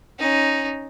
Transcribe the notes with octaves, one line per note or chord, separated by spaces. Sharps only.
C#4 D#4